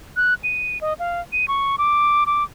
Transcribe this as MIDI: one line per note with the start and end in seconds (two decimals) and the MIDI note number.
0.16 0.34 90
0.44 0.81 99
0.81 0.94 75
0.99 1.21 77
1.33 1.46 99
1.48 1.76 85
1.78 2.24 86
2.26 2.44 86